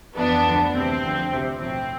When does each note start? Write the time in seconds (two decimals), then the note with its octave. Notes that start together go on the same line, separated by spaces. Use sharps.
0.15 F2 E3 B3 D4
0.44 D2 D3 F3
0.73 D2 C3 E3 C4
1.02 F2 D3 F3
1.29 D2 C3 F3
1.59 B1 A2 F3 C4